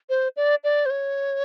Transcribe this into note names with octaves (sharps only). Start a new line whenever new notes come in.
C5
D5
D5
C5
C#5